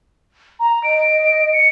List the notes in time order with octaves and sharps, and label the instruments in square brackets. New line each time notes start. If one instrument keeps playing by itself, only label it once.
[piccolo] A#5
[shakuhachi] D#5 [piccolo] D7
[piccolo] C#7